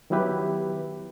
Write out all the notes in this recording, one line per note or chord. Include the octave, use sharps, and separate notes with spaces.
D#3 F#3 B3 E4 G4 B4